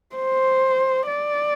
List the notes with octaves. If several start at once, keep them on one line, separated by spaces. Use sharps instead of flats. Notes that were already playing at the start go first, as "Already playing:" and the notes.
C5
D5